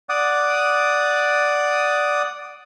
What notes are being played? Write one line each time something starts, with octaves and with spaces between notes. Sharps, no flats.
D5 F#5 D6 D#6